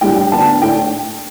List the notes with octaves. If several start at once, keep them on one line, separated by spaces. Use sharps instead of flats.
A2 G3 D4 G5
G5
D2 D3 B3 D4 A5
A2 A3 D4 G5